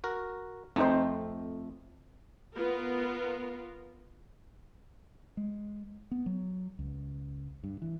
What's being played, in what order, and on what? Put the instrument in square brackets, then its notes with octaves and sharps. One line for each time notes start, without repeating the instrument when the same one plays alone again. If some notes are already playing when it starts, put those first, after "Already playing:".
[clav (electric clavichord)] F#4 A#4
[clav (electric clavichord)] F2 A3 [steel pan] C4 D#4 C5
[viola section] B3 F4 A#4
[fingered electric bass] G#3
B3
F#3
C#2
G2
E3